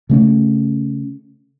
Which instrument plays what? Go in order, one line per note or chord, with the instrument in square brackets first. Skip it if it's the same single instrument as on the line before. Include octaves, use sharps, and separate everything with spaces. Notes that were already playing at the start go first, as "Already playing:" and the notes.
[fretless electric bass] C#3 A3 C#4